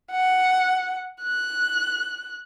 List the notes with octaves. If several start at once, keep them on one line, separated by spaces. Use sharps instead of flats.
F#5
F#6